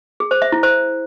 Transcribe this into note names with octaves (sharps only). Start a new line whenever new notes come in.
G#4
C5
E5
E4
C5